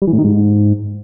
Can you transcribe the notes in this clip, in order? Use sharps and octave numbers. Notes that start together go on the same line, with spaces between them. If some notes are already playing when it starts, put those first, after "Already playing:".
G3
E3
A2
D#3
G#2